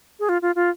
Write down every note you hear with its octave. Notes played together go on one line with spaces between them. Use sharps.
G#4
F4
F4
F4